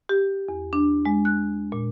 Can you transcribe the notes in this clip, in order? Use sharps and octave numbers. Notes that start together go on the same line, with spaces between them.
G4
E2
D4
G#3
F#6
A#2